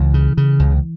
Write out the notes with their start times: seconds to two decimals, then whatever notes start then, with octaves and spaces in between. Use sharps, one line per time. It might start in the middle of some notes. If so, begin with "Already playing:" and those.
Already playing: C#2 E3
0.14 C#3
0.37 C#3
0.59 C#2